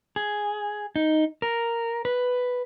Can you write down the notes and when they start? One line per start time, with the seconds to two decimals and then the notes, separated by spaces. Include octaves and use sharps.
0.16 G#4
0.96 D#4
1.42 A#4
2.05 B4